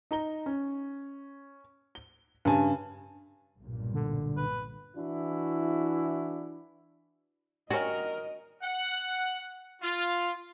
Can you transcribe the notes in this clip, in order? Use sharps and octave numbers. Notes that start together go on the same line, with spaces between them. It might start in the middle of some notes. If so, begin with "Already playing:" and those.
D#4 A#5 G7
C#4
G7
G2 C#3 G#5 A5
B1 G2 A#2
D3
B4
E3 D4 E4 F#4
G3 C#4 F#4 A#4 D#5
F#5
F4